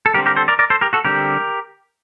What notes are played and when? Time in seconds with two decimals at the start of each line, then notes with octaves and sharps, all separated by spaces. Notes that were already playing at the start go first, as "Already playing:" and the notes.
0.06 A4
0.14 D3 G3 C4 G4 A#4
0.26 G4 A#4
0.36 A4 C5
0.48 A#4 D5
0.59 A#4 D5
0.70 A4 C5
0.81 G4 A#4
0.93 F#4 A4
1.05 D3 G3 C4 G4 A#4